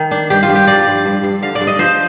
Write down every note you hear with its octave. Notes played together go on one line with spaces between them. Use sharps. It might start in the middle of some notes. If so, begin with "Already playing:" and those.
Already playing: D#3
D4
G2 G4
F4
G2
G4
F3 D5
G2
G2
G2
D3 F5
D5
G2
D#5
F3 C5